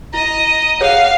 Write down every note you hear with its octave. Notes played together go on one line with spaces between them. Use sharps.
E4 D#5 A#5
G#4 C#5 F5 F#5